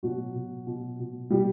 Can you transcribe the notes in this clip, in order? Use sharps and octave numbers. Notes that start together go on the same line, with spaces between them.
B2 F#3 F#4
B2
B2
B2
B2 G3 G4